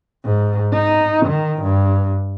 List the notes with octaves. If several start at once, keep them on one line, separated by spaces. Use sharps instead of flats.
G#2
D#4
D#3
G2